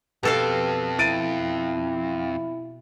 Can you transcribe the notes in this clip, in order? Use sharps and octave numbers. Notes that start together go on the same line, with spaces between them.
F2 B2 G4 A4 F5
E4 A6 D7 D#7